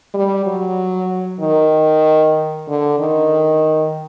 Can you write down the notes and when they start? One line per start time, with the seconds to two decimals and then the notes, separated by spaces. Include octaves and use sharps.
0.14 G3
0.46 F#3
1.40 D#3
2.68 D3
2.99 D#3